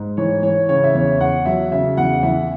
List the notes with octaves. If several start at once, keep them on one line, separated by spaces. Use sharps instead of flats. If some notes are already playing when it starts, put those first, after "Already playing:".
Already playing: G#2
E3 C#5
E3 C#5
C#3 C#5
E5
E2 C#5
E2 F#5
F#3 E5
C#3 E5
E2 F#5
E3 E5